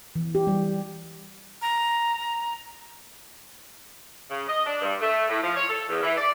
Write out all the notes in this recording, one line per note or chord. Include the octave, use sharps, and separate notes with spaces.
E3
G4
G3
A#5
C#3
D#5
D4
G2
A3
A2
F3
C#5
A4
E2
E3
D5